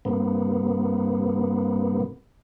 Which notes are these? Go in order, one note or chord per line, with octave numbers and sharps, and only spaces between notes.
G2 C3 A#3 B3